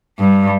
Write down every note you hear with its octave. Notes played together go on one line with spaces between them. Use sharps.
G2